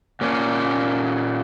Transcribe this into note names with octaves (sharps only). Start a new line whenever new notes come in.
A#2 A#3 C#4